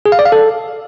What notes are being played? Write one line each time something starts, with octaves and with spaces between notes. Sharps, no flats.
G#4
F5
D5
F5
A4